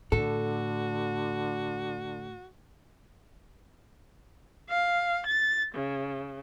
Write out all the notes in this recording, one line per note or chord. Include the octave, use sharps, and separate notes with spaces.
A2 D3 F#4 A4
F5
A6
C#3